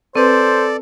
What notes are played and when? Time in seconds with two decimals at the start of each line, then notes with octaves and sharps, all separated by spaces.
0.16 C4 A4 B4 C5 D5